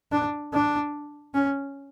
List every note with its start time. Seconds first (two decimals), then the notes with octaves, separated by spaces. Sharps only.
0.12 D4
0.53 D4
1.34 C#4